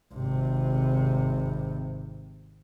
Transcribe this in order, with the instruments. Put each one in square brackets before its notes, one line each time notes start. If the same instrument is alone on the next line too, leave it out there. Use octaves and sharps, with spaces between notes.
[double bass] G#1 C3